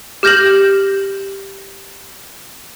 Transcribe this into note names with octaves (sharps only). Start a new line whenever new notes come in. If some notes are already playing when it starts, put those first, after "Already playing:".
G4 F6 G6 A#6 E7 F#7